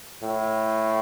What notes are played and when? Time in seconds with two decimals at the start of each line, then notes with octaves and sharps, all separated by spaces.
0.23 A2